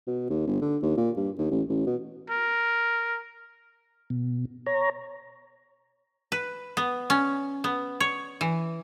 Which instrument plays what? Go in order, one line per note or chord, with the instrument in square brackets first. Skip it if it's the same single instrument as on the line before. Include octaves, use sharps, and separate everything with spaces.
[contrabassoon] B2
D#2
G1
D3
D#2
A#2
G2
D#2
A1
A1
B2
[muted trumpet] A#4
[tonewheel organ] B2
C#5 A#5
[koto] B4
B3
C#4
B3
C#5
E3